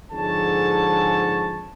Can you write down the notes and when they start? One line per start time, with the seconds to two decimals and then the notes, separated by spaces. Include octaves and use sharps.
0.12 F2 G#2 D3 G#4 C#5 A5